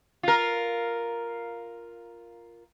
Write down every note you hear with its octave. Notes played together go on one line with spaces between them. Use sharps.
F4 A#4